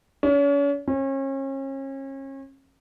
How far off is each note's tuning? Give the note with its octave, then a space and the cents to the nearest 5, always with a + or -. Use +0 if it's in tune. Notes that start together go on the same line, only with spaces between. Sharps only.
C#4 +40
C#4 -35